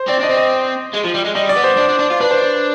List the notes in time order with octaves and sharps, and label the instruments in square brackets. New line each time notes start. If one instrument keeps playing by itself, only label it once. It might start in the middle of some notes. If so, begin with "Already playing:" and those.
Already playing: [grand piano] C5
[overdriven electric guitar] C4 [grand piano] D5
[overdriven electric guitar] D4 [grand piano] D#5
[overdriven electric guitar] C4
[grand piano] D#5
[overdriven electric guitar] G#3
F3
G3
G#3
[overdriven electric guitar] G3 [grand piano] D#5
[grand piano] D5
[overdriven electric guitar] B3
[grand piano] C5
[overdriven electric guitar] D4
D4
D4
F4
[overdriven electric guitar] D4 [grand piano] B4
[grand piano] C5
C5